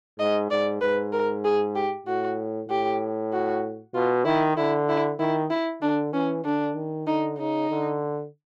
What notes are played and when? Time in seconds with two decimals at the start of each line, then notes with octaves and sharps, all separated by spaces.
0.19 G#2 D#5
0.51 G#2 D5
0.81 G#2 B4
1.13 A#4
1.44 G#4
1.75 G4
2.07 A2 F#4
2.69 A2 G4
3.33 F#4
3.95 B2 F4
4.25 D#3 E4
4.57 D3 E4
4.89 E4
5.19 D#3 E4
5.50 E4
5.82 D3 D4
6.13 E3 C#4
6.44 D3 D4
6.76 D#3
7.07 D3 D#4
7.38 C#3 D#4
7.70 D3